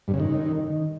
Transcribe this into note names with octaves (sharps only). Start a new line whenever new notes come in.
G2
C#3
D#3